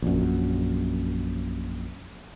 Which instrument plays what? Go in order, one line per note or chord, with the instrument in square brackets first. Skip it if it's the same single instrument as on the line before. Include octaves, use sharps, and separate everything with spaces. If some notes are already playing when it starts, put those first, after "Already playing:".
[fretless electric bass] A#1 F#2